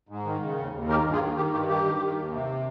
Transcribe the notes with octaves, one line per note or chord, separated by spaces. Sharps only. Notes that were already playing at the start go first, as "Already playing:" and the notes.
G#2
D#3
C#3
D#2
D#2
D#3 G4 A#4
G2
F4 G#4
D#3
D#3 G4
G2 G4
D#3 G4
D#3
D#3
D#2
C3